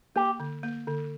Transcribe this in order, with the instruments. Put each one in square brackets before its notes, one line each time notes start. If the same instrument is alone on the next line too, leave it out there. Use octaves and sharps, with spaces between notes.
[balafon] A#3 [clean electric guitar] G4
[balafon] D3
A#3
D3